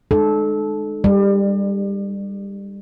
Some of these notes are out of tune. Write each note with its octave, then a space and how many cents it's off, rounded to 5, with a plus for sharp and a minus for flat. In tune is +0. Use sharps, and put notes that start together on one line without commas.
G#3 +0 D#4 -40 A4 -20
G3 +20 D5 +35